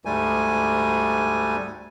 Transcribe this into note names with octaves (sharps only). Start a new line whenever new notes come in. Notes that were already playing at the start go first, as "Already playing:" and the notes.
D2 G#2 G3 A3 G#5